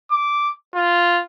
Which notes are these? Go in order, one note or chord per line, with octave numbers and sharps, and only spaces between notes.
D6
F4